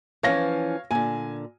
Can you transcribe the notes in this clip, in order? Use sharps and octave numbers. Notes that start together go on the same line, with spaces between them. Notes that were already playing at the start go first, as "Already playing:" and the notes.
E3 F3 C#4 C#5 F5 A#6
A#2 D3 G#5